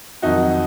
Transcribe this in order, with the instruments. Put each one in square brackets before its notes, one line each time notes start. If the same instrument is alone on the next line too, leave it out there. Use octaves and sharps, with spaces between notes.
[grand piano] F2 D#3 F#3 D#4 F#4